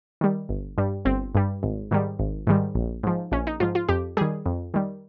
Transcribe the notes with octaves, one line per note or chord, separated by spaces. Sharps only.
D#3 G3
G1
G2 G3
G1 C4
G2 G3
G#1
G#2 D#3 G3
G#1
G#2 D#3 G3
A#1
G#2 F3
A#1 C#4
D#4
G#2 F3 F4
F4
F2 G4
D#3 G3 G#4
F2
D#3 G3